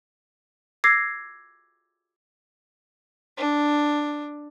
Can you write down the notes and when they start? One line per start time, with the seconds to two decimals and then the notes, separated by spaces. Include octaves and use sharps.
0.84 D6 E6 G#6 A#6 C7
3.38 D4